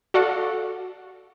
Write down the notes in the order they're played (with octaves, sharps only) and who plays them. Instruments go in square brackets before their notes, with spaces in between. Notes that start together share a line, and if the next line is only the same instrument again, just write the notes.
[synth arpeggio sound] F#4 A4 D5 F5 F#5